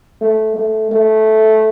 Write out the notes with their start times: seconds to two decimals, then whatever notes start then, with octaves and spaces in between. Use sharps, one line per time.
0.21 A3
0.56 A3
0.91 A3